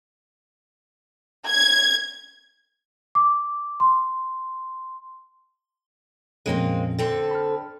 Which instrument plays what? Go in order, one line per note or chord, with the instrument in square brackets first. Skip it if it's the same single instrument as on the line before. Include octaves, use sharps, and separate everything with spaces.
[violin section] G#6
[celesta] D6
C6
[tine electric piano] F2 A#2 C#4 [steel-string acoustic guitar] G#3 A#3 C4
[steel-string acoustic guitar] D3 C4 A4
[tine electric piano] B5 F6